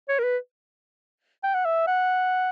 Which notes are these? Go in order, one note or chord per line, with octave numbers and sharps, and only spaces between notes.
C#5
A#4
B4
G5
F#5
E5
F#5